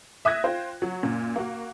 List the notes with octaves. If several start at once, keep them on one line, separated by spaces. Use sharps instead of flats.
E5 D#6 F#6 G#6 A#6
F4 C5 G5
F#3
F#2 A#2
A#3 F#4